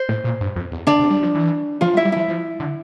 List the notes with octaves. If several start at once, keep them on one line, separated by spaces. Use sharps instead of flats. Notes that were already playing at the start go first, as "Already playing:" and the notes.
Already playing: C5
A2
A#2
G2
F2
E2
D3 D4 D5
C3
G3
F3
E3
F3 F4 F5
G3
E4 E5
G3
F3 E4 E5
F3
D3